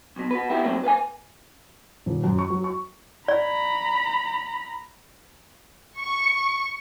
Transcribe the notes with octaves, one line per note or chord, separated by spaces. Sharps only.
B1 B2
F#4 B4
B3 E4 G4
G2 F#3 G3 A3 A#3 C4
B4 C5 F5 G#5
D#1
F#2
C#6
F#3
C#6
D5 A#5 B5
C#6